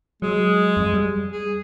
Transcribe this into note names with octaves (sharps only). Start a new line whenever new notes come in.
F#3 G#3
F2
G3
G#4